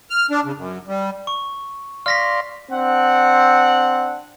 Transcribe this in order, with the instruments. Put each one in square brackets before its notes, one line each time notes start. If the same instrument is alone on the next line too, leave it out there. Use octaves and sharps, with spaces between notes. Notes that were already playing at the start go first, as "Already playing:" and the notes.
[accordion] F6
D4
C#3
F#2
G3
[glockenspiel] C#6
[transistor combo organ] D5 F5 C6 [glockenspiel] F6 A#6 B6
[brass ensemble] C4 D4 F#5